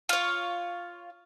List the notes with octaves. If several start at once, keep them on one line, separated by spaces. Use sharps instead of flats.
F4 C#5